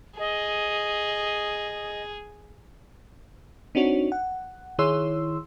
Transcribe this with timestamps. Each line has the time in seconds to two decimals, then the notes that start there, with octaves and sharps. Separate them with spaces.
0.19 G#4 D#5
3.75 C4 D4 D#4 F#4 C#5
4.12 F#5
4.79 D#3 E4 G#4 C#5 C6 E6